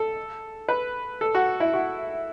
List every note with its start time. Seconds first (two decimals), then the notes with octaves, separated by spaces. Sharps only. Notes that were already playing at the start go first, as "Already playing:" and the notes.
Already playing: A4
0.69 B4
1.21 A4
1.35 F#4
1.60 E4
1.74 F#4